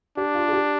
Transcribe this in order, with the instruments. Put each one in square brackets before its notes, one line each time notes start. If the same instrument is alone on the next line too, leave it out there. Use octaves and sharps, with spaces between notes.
[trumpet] D4 [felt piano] G4
[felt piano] F4
G#4
G4